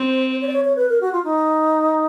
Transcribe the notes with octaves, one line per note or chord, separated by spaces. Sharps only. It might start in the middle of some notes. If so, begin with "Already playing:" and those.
Already playing: C4 C5
C#5
D5
C#5
C#5
B4
A#4
F#4
F4
D#4